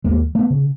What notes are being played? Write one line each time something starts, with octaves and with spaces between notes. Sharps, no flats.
D#2 G#3 A#3
A3 B3
C#3